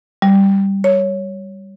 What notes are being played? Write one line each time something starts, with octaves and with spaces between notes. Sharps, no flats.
G3
C#5